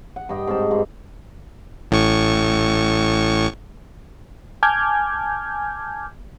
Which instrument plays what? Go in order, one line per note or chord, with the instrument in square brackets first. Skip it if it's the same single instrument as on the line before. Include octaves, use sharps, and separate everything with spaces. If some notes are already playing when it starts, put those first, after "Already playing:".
[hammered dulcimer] F#5
G2 D#5 G5
G#2 C4 A5
G2
[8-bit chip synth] A1 A2 C#6
[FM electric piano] G#5 A5 D6 F6 G6 G#6